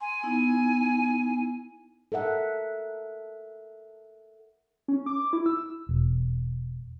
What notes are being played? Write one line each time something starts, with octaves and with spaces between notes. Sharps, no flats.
G#5 C6
B3 D#4 E4
A4 A#4 E5 F#5
C#4
D6
E4
E6
E1